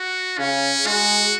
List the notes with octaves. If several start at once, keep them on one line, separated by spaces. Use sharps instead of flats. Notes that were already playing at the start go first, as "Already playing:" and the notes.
Already playing: F#4
C#3 C#4
G#3 F#4